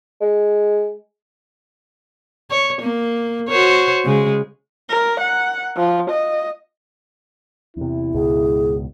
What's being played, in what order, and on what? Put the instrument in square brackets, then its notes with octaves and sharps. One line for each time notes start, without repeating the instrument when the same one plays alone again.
[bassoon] G#3
[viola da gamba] C#5
A#3
F#4 C5 C#5
C#3 G#3
[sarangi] A#4
F#5
F3
D#5
[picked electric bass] E2 C3 [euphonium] E4
[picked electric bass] C#2 G#2 B2 [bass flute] G#4